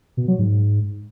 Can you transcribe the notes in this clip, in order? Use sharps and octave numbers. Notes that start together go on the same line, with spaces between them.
B2
F#3
G#2